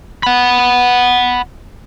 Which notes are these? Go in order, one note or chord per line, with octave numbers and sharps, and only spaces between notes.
F#5 B5